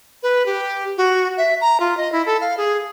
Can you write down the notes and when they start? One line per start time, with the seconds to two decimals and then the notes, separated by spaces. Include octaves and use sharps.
0.23 B4
0.46 G4
0.98 F#4
1.38 E5
1.61 A#5
1.80 F4
1.97 D#5
2.12 E4
2.26 A4
2.41 F5
2.57 G#4